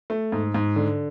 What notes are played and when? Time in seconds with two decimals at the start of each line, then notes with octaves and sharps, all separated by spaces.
0.10 A3
0.32 G#2
0.54 G#2
0.76 D3